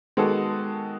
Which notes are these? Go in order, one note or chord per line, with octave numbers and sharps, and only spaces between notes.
D#3 G#3 B3 F#4 A4